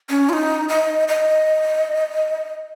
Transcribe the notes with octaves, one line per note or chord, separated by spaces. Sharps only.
C#4
F4
D#4
D#5
D#5